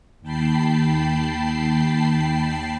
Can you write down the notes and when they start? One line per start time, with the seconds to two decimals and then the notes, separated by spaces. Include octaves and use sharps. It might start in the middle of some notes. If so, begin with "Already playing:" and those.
0.22 D#2 G5 A5 B5 C7